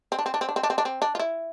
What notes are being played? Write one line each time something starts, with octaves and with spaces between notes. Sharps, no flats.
C4
D4
C4
D4
C4
D4
C4
D4
C4
D4
C4
D4
F4
E4